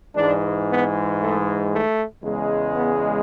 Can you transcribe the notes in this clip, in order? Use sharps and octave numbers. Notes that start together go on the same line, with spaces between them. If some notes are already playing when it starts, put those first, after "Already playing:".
G#2 E3 G#3 D4
B3
A3
A3
E2 C#3 G#3
B3